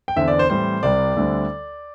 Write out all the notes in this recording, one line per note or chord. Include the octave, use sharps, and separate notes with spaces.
G5
E2 D3 C4 E5
D5
C5
A2 E3 G3 C4 C5
C2 C3 G3 D5
D2 D3 G3 C4